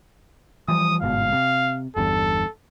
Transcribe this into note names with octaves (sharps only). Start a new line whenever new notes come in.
E3 F3 G3 D#6
G1 G#2 B2 F5
C3
G1 E2 G2 A4